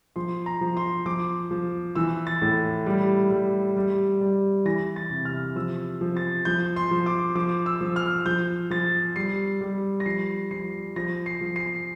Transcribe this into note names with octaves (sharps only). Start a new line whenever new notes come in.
F3 C6
A#5
F3
C6
F3 D6
F3
E3 E6
A6
A2
G3
G3
G3
G3
E3 A#6
A6
C3
F6
F3 E6
F3
A6
F3 G6
C6
F3
D6
F3 D6
E6
F3
F6
F3 G6
F3 A6
G3 C7
G3
A#6
F3 C7
F3 C7
F3 A#6
C7
F3
C7